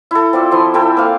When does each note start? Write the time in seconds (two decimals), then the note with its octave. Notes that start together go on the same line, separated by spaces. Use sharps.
0.11 E4 A4
0.33 C4 F4 D5
0.51 F3 E4 C6
0.74 E4 A4 G5 G#5
0.97 A#3 C4 F5